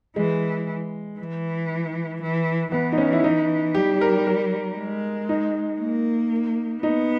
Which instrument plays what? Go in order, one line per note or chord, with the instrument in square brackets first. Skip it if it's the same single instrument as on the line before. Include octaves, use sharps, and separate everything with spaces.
[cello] E3 [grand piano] G#3
[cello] E3
E3
[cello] E3 [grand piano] B3
[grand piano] D#4
C#4
E4
D#4
[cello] G3 [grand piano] G4
[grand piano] A#4
A#4
[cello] G#3
[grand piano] D#4
[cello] A#3
[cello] B3 [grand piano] D#4